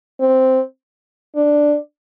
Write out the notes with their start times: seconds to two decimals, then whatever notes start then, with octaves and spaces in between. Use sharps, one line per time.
0.20 C4
1.36 D4